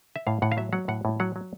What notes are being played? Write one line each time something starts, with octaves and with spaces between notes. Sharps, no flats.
E5
A2 F5
A2 F#5
F5
F#3 E5
F#3 F#5
A2 F#5
A2
F#3 F#5
F#3